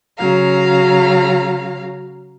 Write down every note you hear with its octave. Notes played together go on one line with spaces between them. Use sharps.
C#3 F#3 F5 A#5